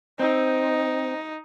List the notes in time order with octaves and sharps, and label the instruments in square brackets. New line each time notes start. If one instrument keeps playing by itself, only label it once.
[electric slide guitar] C4 [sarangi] D#4